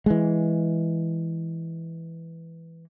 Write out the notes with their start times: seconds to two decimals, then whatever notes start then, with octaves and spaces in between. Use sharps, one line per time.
0.06 E3 G#3